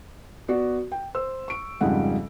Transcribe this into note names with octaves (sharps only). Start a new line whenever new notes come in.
B3 F#4 D5
G5
C5 E6
C#6 D7
F2 G#2 C#3 G3 F#5